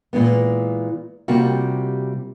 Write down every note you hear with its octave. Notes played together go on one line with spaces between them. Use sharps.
A#2 E3 G#3 B3
C3 G3 A#3 F4 F#4